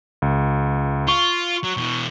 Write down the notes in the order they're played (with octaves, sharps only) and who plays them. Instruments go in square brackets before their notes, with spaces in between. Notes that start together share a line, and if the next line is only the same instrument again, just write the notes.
[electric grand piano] C#2
[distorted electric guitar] F4 [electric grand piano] C#6
[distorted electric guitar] F#3
B2 E3